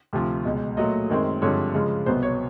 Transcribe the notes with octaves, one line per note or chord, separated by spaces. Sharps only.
D2 C3 F3
C#2 B2 G#3
A#2 F#3 A3 D#5
F#2 D#3 G#3 C4
G2 D3 F3 G#3 C4 C#5
C#3 F3 G#3
C2 B2 F#3 B3 C5
C#5